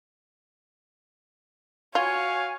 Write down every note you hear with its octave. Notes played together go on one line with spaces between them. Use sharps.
F4 F#4 C#5 F5 G#5